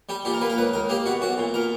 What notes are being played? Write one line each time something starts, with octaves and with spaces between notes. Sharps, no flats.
G3 G4
A#2 G4
A#4
A#3 B4
A#4
C#2 B4
C#2 A#4
A#3 G4
B2 F#4
B1 F#4
A#2
A#2 A#4